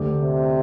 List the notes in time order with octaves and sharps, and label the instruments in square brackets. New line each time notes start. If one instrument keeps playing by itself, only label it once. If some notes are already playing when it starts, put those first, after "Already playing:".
Already playing: [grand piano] D2 D3 A3 D4 G4
[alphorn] C3